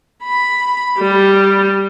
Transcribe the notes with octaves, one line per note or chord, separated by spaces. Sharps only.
B5
G3